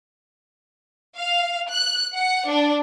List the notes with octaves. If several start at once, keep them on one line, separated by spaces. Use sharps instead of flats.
F5
F#6
F#5
D4